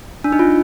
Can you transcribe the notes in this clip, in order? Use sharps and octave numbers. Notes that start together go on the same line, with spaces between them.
D4
D#4
F4